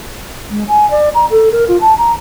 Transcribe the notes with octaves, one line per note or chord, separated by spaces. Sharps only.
G#3
G#5
D5
A#5
A4
A#4
F4
A5
A#5